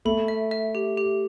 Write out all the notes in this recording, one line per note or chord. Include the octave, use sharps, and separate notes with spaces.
A3 B5
E5
E5
G4
G4